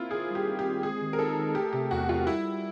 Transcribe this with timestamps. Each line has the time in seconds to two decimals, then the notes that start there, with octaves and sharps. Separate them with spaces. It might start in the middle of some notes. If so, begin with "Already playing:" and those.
Already playing: A#3 C4 E4 F4
0.11 D#3 G#4
0.30 G3
0.35 G4
0.47 D#3
0.59 G4
0.65 C4
0.83 G#3 G#4
1.01 D#3
1.13 A#4
1.19 D#4 A4
1.37 D#3
1.55 A3 G4
1.73 C3 G4
1.91 E2 F#4
2.09 E2 F4
2.27 G3 E4
2.45 G3